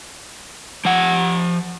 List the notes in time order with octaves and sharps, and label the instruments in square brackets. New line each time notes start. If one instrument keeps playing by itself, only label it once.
[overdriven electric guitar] F3 F#5